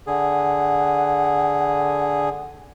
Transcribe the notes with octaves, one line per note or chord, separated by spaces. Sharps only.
D3 G#4 F#5